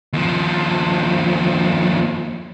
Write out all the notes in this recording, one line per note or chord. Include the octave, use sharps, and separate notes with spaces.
D#2 F3